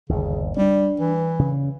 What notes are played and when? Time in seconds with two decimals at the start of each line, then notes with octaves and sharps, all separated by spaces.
0.09 G1 D#2 C#3
0.57 G3 C#4 D4
1.00 E3
1.39 C#3